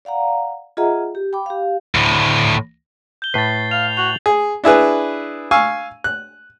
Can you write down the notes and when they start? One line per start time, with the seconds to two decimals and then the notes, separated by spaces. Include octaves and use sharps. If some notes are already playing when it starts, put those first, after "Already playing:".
0.05 D5 F5 F#5 A#5
0.77 F4 G#4 D#5 E5 F#5 A#5
1.15 G4
1.33 G5 B5 D6
1.46 G4 F5
1.95 D2 A2
3.22 G6 G7
3.34 A2 B4 A6 C7
3.71 F5 F7
3.97 F#4 F7 F#7
4.26 G#4
4.64 D4 E4 G#4 B4
5.51 F5 G#5 C#6 E6
6.04 F#6